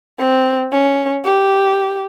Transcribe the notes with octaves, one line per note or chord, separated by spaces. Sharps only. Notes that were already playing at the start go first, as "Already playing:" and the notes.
C4
C#4
G4